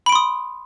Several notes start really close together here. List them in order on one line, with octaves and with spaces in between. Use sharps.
B5 D7 C6 D#6